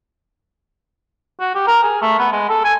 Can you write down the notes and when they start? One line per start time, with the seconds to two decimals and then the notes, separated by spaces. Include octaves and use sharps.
1.40 F#4
1.55 G4
1.67 A#4
1.83 G#4
2.02 A3
2.19 B3
2.32 G#3
2.49 A4
2.64 G#5